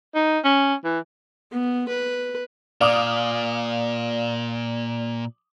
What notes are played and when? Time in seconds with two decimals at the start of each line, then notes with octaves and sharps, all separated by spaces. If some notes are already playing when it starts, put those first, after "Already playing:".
0.15 D#4
0.44 C#4
0.84 E3
1.52 B3
1.88 B4
2.81 A#2 D5 F5 D6 D#6